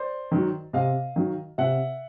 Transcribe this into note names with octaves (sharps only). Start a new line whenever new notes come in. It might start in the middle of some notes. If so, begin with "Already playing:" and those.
Already playing: C5 D5
D#3 F#3
C3 D#5 F5
D#3 F#3
C3 E5 F#5